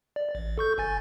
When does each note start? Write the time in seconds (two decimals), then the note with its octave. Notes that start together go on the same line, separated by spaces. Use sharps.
0.16 D5
0.35 A1
0.58 A4 C#6 G6
0.78 G1 G#5 A6